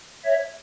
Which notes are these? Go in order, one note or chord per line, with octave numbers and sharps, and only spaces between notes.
C#5 E5